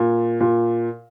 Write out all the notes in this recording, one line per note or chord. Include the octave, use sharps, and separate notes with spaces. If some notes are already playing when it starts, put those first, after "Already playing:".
Already playing: A#2
A#2